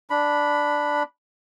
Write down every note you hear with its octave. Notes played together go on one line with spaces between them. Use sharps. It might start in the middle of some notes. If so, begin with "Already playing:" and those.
D4 B5